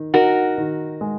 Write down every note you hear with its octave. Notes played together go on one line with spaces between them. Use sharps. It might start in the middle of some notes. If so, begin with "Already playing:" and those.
Already playing: D#3 D#4
D#4 F#4 A#4
D#3
G#3